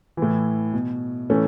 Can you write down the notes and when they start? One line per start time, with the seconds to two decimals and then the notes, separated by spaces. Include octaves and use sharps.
0.17 A2 E3
0.73 B2
1.30 A2 E3 A3 C#4